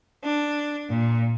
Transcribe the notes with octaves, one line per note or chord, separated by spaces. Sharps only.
D4
A#2